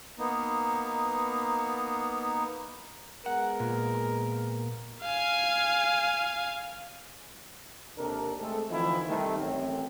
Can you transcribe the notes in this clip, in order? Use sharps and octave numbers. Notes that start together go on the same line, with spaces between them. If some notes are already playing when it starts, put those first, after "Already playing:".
A#3 B3 D#4
G#3 B3 A#4 F#5
A#2
F5 G#5
D#2 C3 D4 A4 A#4
G#3 A3 C4 G#4 A4
D3 E3 F3 C4 D#4 E4
C3 D#3 G3 A3
A1 F#2 C4